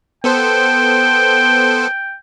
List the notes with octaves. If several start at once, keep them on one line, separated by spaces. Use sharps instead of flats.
B3 A4 C5 G5